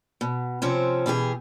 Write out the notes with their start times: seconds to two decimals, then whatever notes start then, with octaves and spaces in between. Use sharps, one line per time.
0.21 B2
0.62 C3 F3 C4 C#4
1.06 B2 E3 G4 G#4